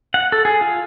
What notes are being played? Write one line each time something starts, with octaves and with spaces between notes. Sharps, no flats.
F#5
A4
G#4
F4